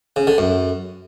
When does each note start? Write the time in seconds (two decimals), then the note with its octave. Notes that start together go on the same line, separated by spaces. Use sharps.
0.16 C#3
0.27 D3
0.38 F#2